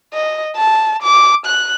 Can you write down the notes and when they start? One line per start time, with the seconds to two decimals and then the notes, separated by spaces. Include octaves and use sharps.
0.13 D#5
0.56 A5
1.03 D6
1.46 F#6